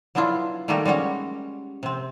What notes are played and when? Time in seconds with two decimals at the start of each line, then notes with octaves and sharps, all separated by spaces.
0.15 F#3 B3 D4 E4 F4
0.68 D#3 G3 A3 A#3 F#4 G4
0.85 G3 G#3 C#4 F#4
1.83 C3 C4